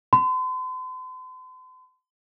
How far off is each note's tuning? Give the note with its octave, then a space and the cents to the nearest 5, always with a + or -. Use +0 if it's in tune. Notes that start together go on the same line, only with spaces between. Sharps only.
C6 -45